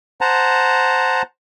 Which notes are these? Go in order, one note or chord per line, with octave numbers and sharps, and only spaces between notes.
C5 F#5 A5 A#5